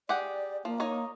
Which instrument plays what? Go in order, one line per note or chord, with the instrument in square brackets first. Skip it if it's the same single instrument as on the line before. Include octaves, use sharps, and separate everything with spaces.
[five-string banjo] G4 G#4 F#5 [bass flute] D5
[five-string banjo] F3 [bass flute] A#3
[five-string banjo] D#4 C#5 D#5